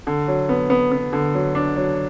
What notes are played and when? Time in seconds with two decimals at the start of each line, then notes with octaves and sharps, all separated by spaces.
0.07 D3
0.28 F#3
0.49 B3
0.70 B3
0.92 B3
1.13 D3
1.34 F#3
1.55 D4
1.76 F#3